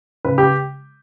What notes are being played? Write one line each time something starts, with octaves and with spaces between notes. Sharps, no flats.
C#3 B4
G4